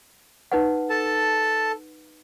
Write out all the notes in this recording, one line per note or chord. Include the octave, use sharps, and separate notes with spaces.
D#4 B4 F#5
A4 A5